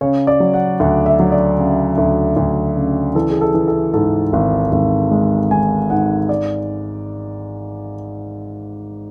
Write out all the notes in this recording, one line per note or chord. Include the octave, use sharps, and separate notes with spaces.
C#3 C#5
D5
F#3
F#5
D2 F#5
E5
F#3
D5
C#3
D2
D2
C#3
E3 A4
G#4
A4
E3
A4
G#2 A4
G#1
G#1
G#3
G#1 G#5
G#2 F#5
D5